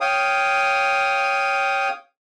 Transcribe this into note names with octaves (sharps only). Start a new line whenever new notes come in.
C#5 F5 G5 D#6